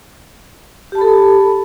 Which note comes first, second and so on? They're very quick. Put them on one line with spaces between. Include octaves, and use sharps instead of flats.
G4 A5 B5 A4